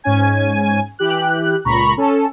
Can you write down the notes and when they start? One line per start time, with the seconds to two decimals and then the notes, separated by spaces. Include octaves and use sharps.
0.04 G#2 C#4 G#5
0.99 E3 G4 F#6
1.65 C#2 A#2 A#5 B5 C#6
1.97 C#4 A4